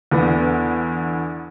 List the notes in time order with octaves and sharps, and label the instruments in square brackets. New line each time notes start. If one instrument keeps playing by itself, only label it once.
[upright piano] E2 D3 B3 D4